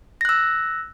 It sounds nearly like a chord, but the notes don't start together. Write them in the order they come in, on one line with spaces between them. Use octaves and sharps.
A#6 F#6 E6